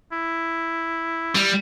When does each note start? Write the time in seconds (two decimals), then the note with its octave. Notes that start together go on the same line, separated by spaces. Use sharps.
0.12 E4
1.35 G3